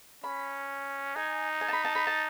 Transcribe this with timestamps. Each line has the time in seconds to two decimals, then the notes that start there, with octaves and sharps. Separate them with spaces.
0.24 C#4 B5
1.16 D#4 G#5
1.61 G#5
1.68 A5
1.73 B5
1.85 A5
1.95 B5
2.07 A5